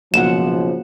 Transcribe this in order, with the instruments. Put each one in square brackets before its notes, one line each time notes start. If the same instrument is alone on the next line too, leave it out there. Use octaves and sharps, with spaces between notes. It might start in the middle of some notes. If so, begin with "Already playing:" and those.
[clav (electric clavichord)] B1 [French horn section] G#2 C#3 F3 [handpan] A#3 F#4 F#5 [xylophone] E7